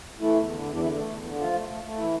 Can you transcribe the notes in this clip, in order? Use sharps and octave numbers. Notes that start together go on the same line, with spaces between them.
E3 A3 E4
E2
D3
E2
D4
D3 E3 E4
A3
E2
D3
F3 A3 F4
A3
A3
A3
E3 E4